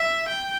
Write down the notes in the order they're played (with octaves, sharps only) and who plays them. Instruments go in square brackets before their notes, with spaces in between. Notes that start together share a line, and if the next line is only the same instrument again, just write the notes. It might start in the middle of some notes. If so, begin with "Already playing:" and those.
Already playing: [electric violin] E5
G5